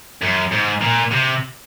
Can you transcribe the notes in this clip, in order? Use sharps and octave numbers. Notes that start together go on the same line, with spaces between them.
F#2
G#2
A#2
C3